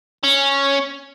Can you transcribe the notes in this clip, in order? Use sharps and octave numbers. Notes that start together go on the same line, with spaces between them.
C#4